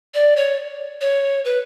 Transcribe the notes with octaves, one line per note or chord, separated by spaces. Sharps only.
D5
C#5
C#5
B4